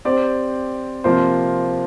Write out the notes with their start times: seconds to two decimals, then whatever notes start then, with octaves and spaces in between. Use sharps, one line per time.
0.05 C4 G4 D5
1.04 C3 F3 A#3 F4 C5